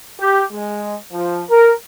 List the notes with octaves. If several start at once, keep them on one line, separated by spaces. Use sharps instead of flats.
G4
G#3
F3
A#4